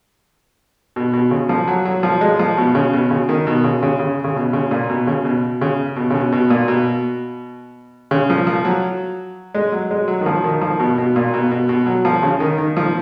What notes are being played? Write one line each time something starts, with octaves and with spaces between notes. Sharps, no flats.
B2
B2
C#3
F3
F#3
F#3
F3
G#3
F3
B2
C#3
B2
C#3
D#3
B2
C#3
C#3
C#3
C#3
B2
C#3
A#2
B2
C#3
B2
C#3
B2
C#3
B2
B2
A#2
B2
C#3
F3
F3
F#3
G#3
F#3
G#3
F#3
D#3
F3
D#3
F3
B2
B2
A#2
B2
B2
B2
F#3
F3
C#3
D#3
D#3
F3